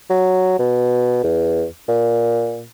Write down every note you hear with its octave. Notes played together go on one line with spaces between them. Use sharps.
F#3
B2
E2
A#2